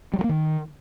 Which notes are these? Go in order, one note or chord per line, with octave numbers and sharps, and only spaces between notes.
G3
F#3
A#3
D#3